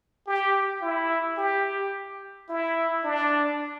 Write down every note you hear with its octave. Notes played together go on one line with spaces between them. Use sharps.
G4
E4
G4
E4
D4